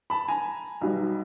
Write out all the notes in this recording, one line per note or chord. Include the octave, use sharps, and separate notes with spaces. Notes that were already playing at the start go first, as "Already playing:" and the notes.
A5 B5
G#5 A#5
B1 B2 G3